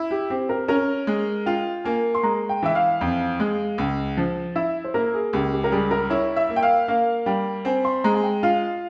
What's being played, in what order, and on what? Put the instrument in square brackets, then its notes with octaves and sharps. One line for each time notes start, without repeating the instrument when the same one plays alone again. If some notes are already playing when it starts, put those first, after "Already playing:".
Already playing: [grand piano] E4
[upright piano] G4
[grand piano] C4 [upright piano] G4
[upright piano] A#4
[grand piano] C#4 [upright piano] A#4
[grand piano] G#3
[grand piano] F4 [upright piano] G5
[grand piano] A#3 [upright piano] G#5
[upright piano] C6
[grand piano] G#3 [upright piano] A#5
[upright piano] G5
[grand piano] E3 [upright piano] E5
[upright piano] F5
[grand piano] F2
G#3
C#2
F3
[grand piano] E4 [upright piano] E5
[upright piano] C5
[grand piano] A#3 [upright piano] A#4
[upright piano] G#4
[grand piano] C#2 [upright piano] G4
[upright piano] G4
A#4
[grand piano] G3 [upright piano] G#4
[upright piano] A#4
[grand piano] E4 [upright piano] C#5
[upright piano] E5
[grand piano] A#3
[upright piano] G5
F5
[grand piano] A#3 [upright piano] F5
[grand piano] G3 [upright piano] G5
[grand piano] C4 [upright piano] G#5
[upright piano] C6
[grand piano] G#3 [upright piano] A#5
[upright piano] G#5
G5
[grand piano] F4 [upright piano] F5